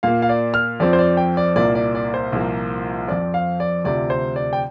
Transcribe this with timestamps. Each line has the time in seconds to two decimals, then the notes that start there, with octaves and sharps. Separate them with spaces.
0.03 A#2 A#3 F5
0.22 F5
0.29 D5
0.54 F6
0.80 F2 F3 C4 D5
0.93 C5
0.99 D5
1.17 G5
1.37 D5
1.56 C2 A#2 A#3 D5
1.75 D5
1.95 D5
2.14 C5
2.32 C2 A#2 F3 A#3
3.08 F2 F3 C4 D5
3.34 F5
3.60 D5
3.84 D2 C3 F3 D5
4.10 C5
4.36 D5
4.53 G5